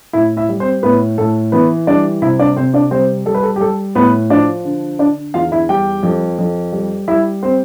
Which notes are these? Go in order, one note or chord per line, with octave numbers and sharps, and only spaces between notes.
A2 E4 E5
E4 E5
G3
C4 C5
A2 B3 B4
A2 A4
E3 B3 B4
G3 D4 D5
C3 E4 E5
D4 D5
C3 C4 C5
D4 D5
G3 C4 C5
G3 A4
B4
A4
G4
G3 A4
A2 B3 B4
F3 D4 D5
D3
D3 D4 D5
E2 F4 F5
E4 E5
G3 G4 G5
F2
F2
G3
G3 E4 E5
C4 C5